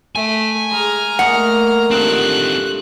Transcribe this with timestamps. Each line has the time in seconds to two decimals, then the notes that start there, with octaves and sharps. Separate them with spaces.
0.16 A3 G#5
0.71 G#3 A#5 F6
1.19 A3 A#3 D#5 F#5
1.91 G2 C4 D#4 F4 A4 F#6